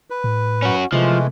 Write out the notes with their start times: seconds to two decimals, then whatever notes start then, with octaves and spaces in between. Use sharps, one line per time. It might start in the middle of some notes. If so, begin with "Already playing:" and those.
0.10 B4
0.24 A2
0.62 C#4 F#4
0.92 C3 E3 F3 G#3 A3